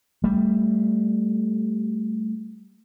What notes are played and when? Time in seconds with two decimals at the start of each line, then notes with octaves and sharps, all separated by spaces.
0.24 G3 A3